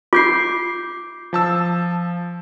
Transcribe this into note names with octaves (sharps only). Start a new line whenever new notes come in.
F4 D6 G6 C7
F3 A5 E6